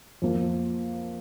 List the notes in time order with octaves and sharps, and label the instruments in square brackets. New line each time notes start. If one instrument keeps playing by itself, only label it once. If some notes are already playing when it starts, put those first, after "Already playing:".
[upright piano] F2 F3 A#3